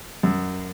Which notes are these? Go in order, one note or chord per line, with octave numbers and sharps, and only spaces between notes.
F#2